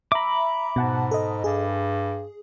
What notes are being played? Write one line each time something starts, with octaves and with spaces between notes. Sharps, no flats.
E5 A#5 B5 D6
G#2 B2 F#5 A5
A4 D#5
G2 G#4